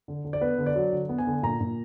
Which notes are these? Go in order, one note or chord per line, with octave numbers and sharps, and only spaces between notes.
D3
D3
D5
B3 B4
D3
D5
F#3
D3
B3
G#5
D3
A#2 A#5
A#2